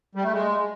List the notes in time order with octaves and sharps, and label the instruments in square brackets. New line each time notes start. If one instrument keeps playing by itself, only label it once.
[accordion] G3
A3
G#3